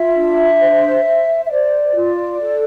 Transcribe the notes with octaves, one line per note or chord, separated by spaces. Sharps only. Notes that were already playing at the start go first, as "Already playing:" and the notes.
Already playing: F4 E5
D4
C5
C5
E5
C5 D5
F4
A4